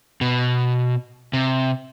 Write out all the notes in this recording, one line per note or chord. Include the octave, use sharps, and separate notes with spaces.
B2
C3